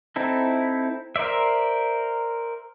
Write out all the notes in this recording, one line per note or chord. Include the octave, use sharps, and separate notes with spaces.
C4 D#4 E4 A4
A#4 C5 D5 E5